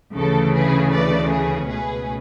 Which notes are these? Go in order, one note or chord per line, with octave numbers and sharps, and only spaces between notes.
D2 C#3 E3 A3 A4
G#4 B4
B4 D5
G#4 B4
C#2 B2 A3 C#4 G#4 B4